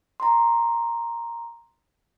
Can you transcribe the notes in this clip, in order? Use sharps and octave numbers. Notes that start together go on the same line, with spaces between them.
A#5 C6